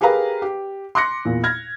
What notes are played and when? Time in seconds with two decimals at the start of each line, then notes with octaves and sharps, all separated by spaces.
0.01 G4 G#4 A#4 B4 F5 A#5
0.42 G4
0.95 C6 D6 F#6 A#6 C#7
1.25 E2 A#2
1.44 F6 G#6 A#6